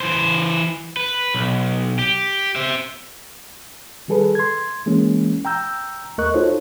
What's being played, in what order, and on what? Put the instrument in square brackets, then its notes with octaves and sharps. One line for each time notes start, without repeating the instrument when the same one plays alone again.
[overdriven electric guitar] E3 C5
B4
B1
G4
C5 E5
[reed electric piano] D#3 G3 G#4 A4 B4
C6 G#6
E3 G#3 A#3 C#4
G5 A#5 E6 G6
D#2 A3 A#4 D#5 C#6 F#6
D#4 F4 F#4 A4 C5 C#5